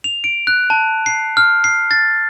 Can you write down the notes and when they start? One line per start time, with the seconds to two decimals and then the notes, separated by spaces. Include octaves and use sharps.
0.04 F7
0.24 D7
0.47 F#6
0.70 A5
1.06 C7
1.37 F6
1.64 C7
1.91 A6